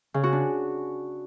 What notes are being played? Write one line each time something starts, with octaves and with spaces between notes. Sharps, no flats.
C#3
F#4
D4